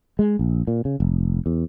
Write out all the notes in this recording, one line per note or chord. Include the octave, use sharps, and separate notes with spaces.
G#3
A#1
A#2
C#3
F1
E2